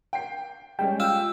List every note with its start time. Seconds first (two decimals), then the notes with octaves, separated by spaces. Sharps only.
0.13 G5 C7
0.79 G3 G#3 C#4 G5
1.00 F4 G5 E6